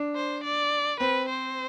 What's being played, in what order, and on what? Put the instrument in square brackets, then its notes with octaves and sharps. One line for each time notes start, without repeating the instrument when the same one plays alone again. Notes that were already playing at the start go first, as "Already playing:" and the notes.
Already playing: [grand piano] D4
[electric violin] C5
D5
[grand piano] C4 [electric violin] B4
[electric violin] C5